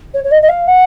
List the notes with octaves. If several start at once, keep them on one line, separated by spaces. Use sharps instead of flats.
C#5
C#5
D#5
D#5
F5
F#5